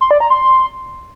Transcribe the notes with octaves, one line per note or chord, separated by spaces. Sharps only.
C6
D5
A#5
C6